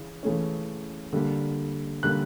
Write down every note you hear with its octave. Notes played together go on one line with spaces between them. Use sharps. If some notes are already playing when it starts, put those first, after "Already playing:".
Already playing: C#3 E3
C#3 E3 A3 C#4
D3 G3 A#3
D3 G3 A#3 F#6